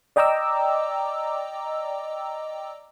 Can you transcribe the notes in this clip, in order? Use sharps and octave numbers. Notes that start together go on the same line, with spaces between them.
D5 D#5 G5 A#5 D6 E6